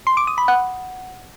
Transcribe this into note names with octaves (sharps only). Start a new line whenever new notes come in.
C6
D6
D#6
B5
F#5